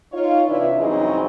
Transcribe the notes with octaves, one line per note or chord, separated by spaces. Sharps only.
D#4 F4 C#5
C3 E3 D4 E4 B4 C#5
G2 C#3 E3 F#3 C4 D#4